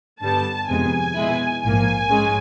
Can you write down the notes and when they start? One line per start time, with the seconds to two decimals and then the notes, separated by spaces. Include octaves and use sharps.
0.21 G2 D3 G3 B3 A5
0.68 F2 C3 D#3 G#3 B3 G#5
1.15 B2 G#3 B3 E4
1.62 A#1 G#2 F3 A#3 G#5
2.10 G#2 G#3 C#4